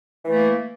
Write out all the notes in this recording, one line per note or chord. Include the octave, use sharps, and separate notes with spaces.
E3 A3 A#3